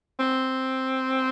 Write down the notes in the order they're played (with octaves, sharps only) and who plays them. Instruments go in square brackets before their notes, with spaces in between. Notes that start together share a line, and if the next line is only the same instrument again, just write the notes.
[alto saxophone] C4